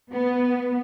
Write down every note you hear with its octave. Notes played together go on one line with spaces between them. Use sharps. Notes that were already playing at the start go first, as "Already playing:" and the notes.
B3